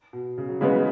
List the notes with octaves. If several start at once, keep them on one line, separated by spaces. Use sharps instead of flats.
B2
C#3
F#3
C#3 E3 G#3 B3